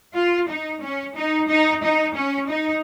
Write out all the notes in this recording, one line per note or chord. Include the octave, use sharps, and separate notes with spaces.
F4
D#4
C#4
D#4
D#4
D#4
C#4
D#4